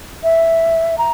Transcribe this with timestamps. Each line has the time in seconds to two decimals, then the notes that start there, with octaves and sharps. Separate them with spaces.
0.24 E5
0.98 A#5